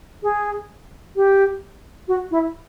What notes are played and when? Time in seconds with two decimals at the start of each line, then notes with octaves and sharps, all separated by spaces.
0.23 G#4
1.16 G4
2.08 F#4
2.31 E4